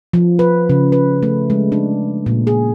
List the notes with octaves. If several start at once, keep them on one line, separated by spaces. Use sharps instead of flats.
F3
B4
C#3
B4
A3
G#3
D4
A#2
G#4